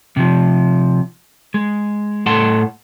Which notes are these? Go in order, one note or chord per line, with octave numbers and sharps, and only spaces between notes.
C3 F3
G#3
A2 A4 F#5 A5 C6